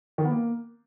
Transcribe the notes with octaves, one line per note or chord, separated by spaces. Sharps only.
D#3
B3
A#3